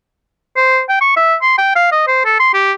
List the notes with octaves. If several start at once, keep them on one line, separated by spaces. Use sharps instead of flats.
C5
G5
C#6
E5
C6
G5
F5
D#5
C5
A4
C6
G4